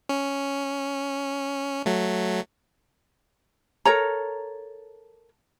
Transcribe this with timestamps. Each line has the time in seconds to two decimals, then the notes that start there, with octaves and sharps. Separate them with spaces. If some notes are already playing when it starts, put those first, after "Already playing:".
0.09 C#4
1.86 F#3 A3
3.85 A4 A#4 C#5 A#5